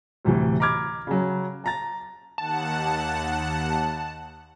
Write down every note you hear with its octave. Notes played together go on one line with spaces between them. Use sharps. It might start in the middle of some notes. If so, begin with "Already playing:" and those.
D2 A2 C3 E3
A#5 B5 D6 F6 G#6
C#3 F#3
A5 A#5 A6
D#2 F#5 A5